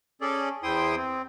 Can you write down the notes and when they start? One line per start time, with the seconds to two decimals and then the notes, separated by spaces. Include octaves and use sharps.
0.21 C#4 G#4 A4 D5
0.63 E2 E4 C5 G5 C6 D#6
0.97 C4